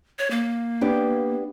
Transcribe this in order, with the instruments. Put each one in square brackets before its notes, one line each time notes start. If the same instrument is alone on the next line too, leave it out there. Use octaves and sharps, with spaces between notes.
[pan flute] C#5
A#3
[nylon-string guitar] B3 D4 G4